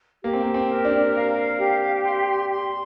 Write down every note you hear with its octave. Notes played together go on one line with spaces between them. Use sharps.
A#3 G4
C4
A#3
C4
A#4
D4
F5
G4
C6
C6